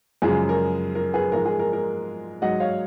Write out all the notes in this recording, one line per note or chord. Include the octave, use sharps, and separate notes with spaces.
F#2 C#3 F3 G#3 G#4
A#4
A#4
G#4 B4
G#2 F3 G#3 A#4
G#4
A#4
A#4
G#2 F#3 D#5 F#5
C#5 F5